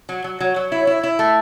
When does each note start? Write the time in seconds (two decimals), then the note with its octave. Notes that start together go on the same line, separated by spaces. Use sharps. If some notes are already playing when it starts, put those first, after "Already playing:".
0.09 F#3
0.24 F#3
0.40 F#3 C#5
0.56 F#3
0.72 E4
0.87 E4
1.03 E4
1.19 A3